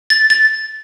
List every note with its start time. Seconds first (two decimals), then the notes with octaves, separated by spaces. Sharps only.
0.10 A6
0.30 A6